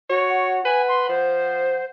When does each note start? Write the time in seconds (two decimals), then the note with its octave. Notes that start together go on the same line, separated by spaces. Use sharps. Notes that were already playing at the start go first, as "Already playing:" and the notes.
0.10 F#4 C#5
0.30 F#5
0.65 B4 G#5
0.89 C6
1.09 F3 C5